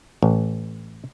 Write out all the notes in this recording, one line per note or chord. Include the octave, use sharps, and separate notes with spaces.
A1